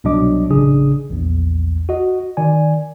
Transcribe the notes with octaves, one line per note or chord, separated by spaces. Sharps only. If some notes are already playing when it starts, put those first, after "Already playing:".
C2 B2 F#3 D4 D#5 D6
A1 C#3 D4 G#4 D#6
A#1 E2
F#4 D#5
D#3 D5 G#5